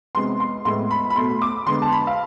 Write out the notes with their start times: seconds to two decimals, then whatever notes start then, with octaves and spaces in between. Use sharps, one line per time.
0.15 C3 G#3 B3 C6
0.40 C6
0.65 A2 G#3 B3 C6
0.91 B5
1.10 B5
1.16 B2 A3 C6
1.42 D6
1.66 D3 G#3 B3 C6
1.82 A5
1.92 B5
2.07 F5